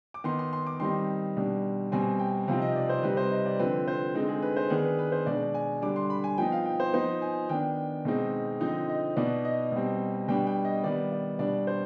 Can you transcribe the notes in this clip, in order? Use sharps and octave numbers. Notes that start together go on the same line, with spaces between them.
D6
D#3 B3 D#4 C6
C6
C6
D6
D#3 G3 C4 D#4 C6
B2 G3 D4
B2 G3 C4 G#5
G5
C3 F3 C4 D#4 F5
D#5
D5
C5
C3 G3 C4 D#4 B4
C5
D#5
D5
D3 F3 C4 B4
C5
D3 G#3 C4 D#4
G#4
B4
C5
D#3 B3 D4 G#4
B4
B4
C5
B2 G#3 D4 D5
G#5
D3 G3 D4 D6
C6
B5
G#5
F3 B3 D#4 G5
F5
G5
C5
F3 B3 D#4 C5
G#5
D#3 B3 D4 G5
B2 G#3 C4 D#4
D3 F3 C4 D#4 D#5
D#5
B2 B3 D#4 D5
D#5
B2 G3 C4
B2 G3 B3 D4 G5
G5
D#5
D#3 G3 B3 D5
D5
B2 G3 D4 D5
C5